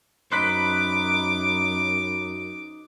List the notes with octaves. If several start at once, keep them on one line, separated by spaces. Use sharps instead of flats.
F#2 D#4 C5 B5 D6 F#6 B6